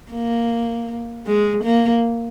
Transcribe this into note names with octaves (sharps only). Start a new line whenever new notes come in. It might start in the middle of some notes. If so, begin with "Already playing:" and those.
A#3
G#3
A#3